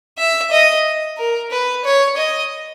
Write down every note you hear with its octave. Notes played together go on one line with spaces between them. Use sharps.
E5
D#5
A#4
B4
C#5
D#5